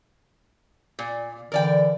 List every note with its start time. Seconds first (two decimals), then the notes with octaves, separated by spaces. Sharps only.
0.99 A#2
1.52 D3 E3 A#4 D5 G5